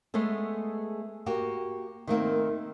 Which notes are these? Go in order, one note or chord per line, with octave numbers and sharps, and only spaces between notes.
G#3 A3 B3 G#4 A4
A#3 F#4 G4
D#3 A3 A#3 C4